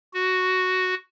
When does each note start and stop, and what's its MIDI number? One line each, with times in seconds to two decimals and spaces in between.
0.13 0.94 66